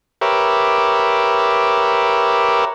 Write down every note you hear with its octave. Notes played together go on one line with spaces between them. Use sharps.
G4 A#4 B4 C#5 E5 D6